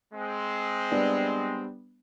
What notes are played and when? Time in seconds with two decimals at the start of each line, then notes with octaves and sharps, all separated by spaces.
0.13 G#3 C4
0.92 G3 B3 D4